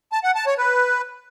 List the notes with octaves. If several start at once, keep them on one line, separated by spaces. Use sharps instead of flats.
A5
F#5
A5
C#5
B4